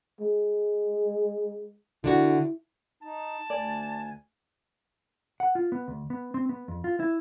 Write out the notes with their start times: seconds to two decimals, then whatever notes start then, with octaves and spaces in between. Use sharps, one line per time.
0.21 G#3
2.04 D3 D4 E4 F#4
3.03 D#4 A5
3.50 D2 D5 G#5
5.40 F#5
5.55 F4
5.72 B3
5.88 D2
6.10 B3
6.34 C4
6.49 B3
6.68 F2
6.84 F4
7.00 E4